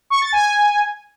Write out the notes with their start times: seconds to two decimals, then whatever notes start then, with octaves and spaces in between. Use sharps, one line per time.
0.10 C#6
0.21 A6
0.33 G#5